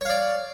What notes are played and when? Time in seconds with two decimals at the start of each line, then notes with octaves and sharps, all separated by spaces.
0.01 C#5
0.05 F5
0.09 D5